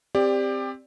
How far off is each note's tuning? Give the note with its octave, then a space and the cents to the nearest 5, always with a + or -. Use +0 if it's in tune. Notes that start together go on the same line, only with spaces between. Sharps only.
C4 +0 G4 +20 D5 +0